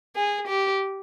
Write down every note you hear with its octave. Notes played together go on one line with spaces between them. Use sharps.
G#4
G4